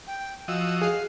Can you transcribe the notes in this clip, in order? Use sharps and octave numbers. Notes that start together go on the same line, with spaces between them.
G5
F3 F#4 D#5 E6
G#4 F5